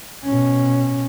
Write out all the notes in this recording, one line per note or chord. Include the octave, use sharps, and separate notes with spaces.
B2 C#4